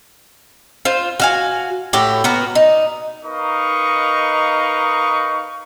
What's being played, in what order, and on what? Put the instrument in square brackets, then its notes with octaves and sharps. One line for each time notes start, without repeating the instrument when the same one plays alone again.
[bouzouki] F4 C5
F#4 F5 G#5
A2 F#4 G4
B3 F#4 A#4
D#4
[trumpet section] D#4 A#4 B4 D#5 F5 C#6